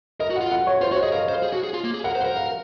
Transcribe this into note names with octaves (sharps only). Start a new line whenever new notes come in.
A#4 D#5
F#4
F#5
F4
F#5
C#5
F4 C5
F#4 C#5
G#4 D#5
A#4 F5
D#5
C5
F5
G#4
F#4
G#4
F4
A#3
G#4
A#4 F#5
C5
F#5
A#4
F5